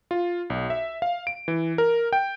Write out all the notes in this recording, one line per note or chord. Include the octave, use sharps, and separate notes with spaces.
F4
B1
E5
F5
D7
E3
A#4
G5